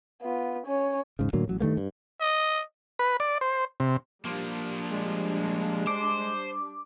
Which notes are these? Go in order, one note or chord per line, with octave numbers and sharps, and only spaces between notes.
B3 F4
C#4 C#5
E1 G#2 C#3
A2 D3 F#3 A#3
A1 F#3
G2 D#3 A3 A#3
G2
D#5
B4
D5
C5
C3
F3 G3 A#3 D4
G#3
C5 D6